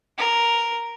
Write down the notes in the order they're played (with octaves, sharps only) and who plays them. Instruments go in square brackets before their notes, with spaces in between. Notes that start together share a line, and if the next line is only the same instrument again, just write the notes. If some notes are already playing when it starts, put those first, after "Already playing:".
[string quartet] A#4